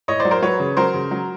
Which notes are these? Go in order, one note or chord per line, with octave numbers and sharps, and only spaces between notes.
A2 C#5 D#5
C5 D5
F#3
A#4 C5
F#3 B4 C#5
C#3
F#3 A#4 C5
C#3
F#3